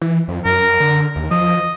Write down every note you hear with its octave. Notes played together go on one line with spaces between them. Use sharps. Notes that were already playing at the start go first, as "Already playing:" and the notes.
E3
F2
F#2 A#4
D3
D#2
F3 D#5